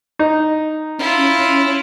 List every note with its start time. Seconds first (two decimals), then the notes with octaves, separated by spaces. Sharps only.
0.19 D#4
0.99 C#4 E4 F4